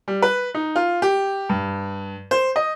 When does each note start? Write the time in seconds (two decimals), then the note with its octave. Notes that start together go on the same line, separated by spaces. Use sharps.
0.08 G3
0.22 B4
0.55 D#4
0.76 F4
1.02 G4
1.49 G2
2.31 C5
2.56 D#5